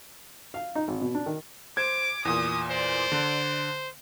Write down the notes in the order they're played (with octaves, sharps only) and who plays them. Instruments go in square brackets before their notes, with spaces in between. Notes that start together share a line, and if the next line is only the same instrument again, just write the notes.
[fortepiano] F5
D#4
G#1
B2
D4
D#3
[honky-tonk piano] C5 G#6 [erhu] D6
[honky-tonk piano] E2 A#2 [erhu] D#6
[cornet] C5 [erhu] D5
[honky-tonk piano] D3